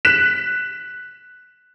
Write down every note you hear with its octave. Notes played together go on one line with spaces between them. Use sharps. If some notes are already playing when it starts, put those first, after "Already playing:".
F#6 B6 E7